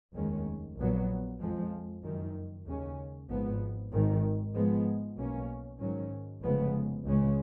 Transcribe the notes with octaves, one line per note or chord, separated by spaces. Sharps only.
F1 D#2 D#3 G#3 C#4
A#1 A#2 F#3 B3
F2 F3 G#3
F#1 F#2 D#3
D#2 C#3 G#3 C#4
G#1 G#2 F3 B3
G#1 G#2 D#3
G#2 F3 G#3 B3
B1 B2 A#3 C#4
G#2 D#3 F#3 C#4
F1 F2 C#3 G#3 B3
C#2 C#3 G#3 C#4